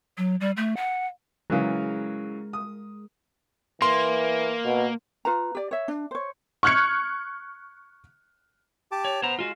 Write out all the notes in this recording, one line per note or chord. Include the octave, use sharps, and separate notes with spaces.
F#3
G3
A3
F#5
C#3 E3 F#3 G#3 A#4
D#6
E3 A#3 C6
B2
F4 B4 A#5
G4 D5
C#5 E5
D4
C5 C#5
C#6 F6 F#6 G#6 C#7
G4 A5 D6
C#5
B3 C5 A#5
G#3 F4 F#4